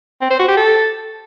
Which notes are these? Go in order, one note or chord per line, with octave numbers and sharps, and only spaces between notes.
C4
C5
F#4
G4
A4